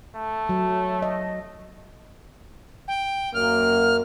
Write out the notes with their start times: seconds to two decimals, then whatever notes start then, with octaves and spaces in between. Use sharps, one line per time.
0.16 A3
0.49 F#3
1.02 D#5
2.88 G5
3.34 F#2 A#3 F6